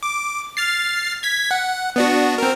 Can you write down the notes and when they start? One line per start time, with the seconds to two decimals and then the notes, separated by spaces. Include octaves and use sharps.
0.03 D6
0.57 F6 A6 C7
1.23 G#6 B6
1.51 F#5
1.96 B3 D4 F#4
2.38 C4 A#4